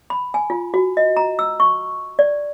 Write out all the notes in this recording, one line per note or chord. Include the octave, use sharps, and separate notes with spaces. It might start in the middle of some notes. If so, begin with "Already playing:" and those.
B5
G#5
F4
F#4
D#5
A#5
E6
C#6
D5